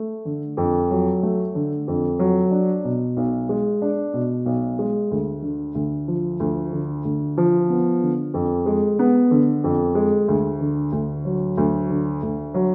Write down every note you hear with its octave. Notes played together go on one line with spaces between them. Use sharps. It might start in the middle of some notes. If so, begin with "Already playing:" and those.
Already playing: A3
D3
F2
F#3
A3
D3
F2
F#3
D4
B2
B1
G#3
D4
B2
B1
G#3
D2
D3
D2
F3
D2
D3
D2
F3
B3
D3
F2
G#3
B3
D3
F2
G#3
D2
D3
D2
F#3
D2
D3
D2
F#3